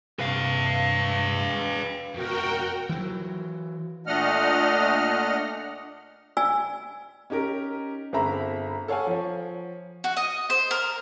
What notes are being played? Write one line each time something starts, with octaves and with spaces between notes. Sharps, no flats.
G2 C3 B4 F5
F2 B2 F#4 A#4 G5
E3 F#3
A#2 A3 D4 D#5 F#5 F6
D5 G#5 E6
C#4 D#4 G4 A#4
G1 C4 G#4 E5 A#5 B5
A4 C#5 F5 F#5 G#5
F3 C#5
F#4
D#5
C5
A#4